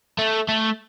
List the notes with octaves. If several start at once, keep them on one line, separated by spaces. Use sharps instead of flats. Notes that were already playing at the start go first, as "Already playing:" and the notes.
A3
A3